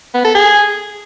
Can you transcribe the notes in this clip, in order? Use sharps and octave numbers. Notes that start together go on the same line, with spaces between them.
B3
A4
G#4